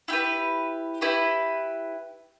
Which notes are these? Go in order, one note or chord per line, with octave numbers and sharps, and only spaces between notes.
E4 G4 B4
E4 G4 B4